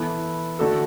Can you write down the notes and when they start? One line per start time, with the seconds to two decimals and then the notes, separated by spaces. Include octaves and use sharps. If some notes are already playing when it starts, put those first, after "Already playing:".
Already playing: E3 B3 E4 A4
0.59 D3 A3 F#4 A4